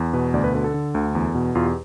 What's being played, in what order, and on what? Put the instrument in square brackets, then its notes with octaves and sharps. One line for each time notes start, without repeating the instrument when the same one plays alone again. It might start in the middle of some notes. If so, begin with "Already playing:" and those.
Already playing: [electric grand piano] E2
B2 B4
D2 D5
B4
D3 B4
A4
D3
D2
E2
B2
E2 F4
G4